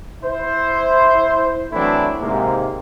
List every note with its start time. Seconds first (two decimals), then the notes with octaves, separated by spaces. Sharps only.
0.22 E4 C5
1.72 E3 F#3 A3 C4 D4 E4
2.20 G#2 C3 A#3